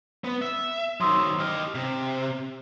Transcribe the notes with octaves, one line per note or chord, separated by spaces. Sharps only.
B3
E5
D#3 F#3 C6 D#6 E6
G4 D#5 F6
C3